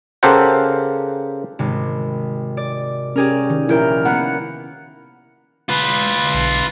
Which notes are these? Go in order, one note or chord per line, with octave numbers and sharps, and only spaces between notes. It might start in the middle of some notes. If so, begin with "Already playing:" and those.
C#3 G4 A4 A#4 C5 F#5
G#1 C3
D5
C#4 G4 G#4 A#4
D#3
A#1 E4 A#4 G6 D7
A#3 B3 F#5
F4 B4
B1